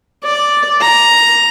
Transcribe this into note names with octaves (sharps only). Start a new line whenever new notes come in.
D5
A#5